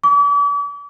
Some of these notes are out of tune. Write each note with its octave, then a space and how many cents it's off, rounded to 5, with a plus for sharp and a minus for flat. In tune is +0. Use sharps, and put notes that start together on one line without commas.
D6 -45